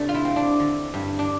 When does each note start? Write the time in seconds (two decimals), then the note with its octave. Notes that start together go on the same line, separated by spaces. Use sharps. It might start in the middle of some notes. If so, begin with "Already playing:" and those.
Already playing: C3 A3 D4
0.09 F4
0.14 E4
0.25 C4
0.36 D4
0.60 D3
0.94 G2
1.19 D4